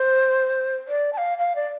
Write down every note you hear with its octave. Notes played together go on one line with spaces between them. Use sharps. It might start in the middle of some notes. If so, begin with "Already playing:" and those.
Already playing: C5
D5
A5
F5
F5
D5